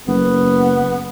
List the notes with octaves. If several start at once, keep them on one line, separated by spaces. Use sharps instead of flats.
F#1 B3